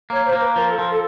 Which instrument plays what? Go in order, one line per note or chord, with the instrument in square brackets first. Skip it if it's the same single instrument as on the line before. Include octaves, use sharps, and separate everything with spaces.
[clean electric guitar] A#3 [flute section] C#5
[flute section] C5
[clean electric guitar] A#3
[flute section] B4
[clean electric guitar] F3 [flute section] A#4
[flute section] A4
[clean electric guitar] F3 [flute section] A#4
[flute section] A4